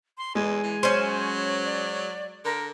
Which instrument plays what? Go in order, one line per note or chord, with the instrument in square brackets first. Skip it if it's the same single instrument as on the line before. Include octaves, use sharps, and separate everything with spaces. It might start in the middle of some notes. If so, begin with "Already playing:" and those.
[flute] C6
[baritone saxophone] E2 [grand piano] G#3 [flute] G#5
[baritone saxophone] E3
[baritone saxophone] F#3 [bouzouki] C#4 C5
[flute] D5
[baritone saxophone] D3 [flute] A#4